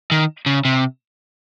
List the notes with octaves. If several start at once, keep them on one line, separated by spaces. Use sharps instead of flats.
D#3
C#3
C3